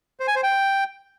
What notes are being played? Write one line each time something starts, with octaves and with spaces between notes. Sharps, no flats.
C5
G#5
C5
G5